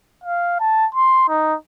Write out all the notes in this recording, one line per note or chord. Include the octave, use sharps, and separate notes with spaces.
F5
A5
C6
D#4